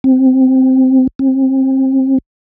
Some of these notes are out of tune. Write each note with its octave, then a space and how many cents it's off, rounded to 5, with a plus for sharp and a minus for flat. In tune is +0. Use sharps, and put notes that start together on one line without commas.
C4 -5
C4 +25